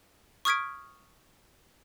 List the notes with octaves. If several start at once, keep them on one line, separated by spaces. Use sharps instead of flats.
C#6 D#6 F6 G#6 B6 D7